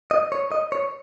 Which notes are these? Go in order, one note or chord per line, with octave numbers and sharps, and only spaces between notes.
D#5
C#5
D#5
C#5